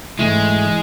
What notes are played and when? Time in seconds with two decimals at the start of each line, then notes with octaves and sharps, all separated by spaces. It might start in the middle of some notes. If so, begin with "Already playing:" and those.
0.19 G#2 E3 G#3 A3 E4
0.66 E3